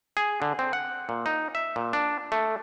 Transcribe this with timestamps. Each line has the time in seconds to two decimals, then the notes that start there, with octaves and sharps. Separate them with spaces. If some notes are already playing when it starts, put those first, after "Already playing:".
0.17 G#4
0.42 D3
0.59 C4
0.73 F#5
1.09 A#2
1.26 D#4
1.55 E5
1.76 A#2
1.93 D4
2.32 A3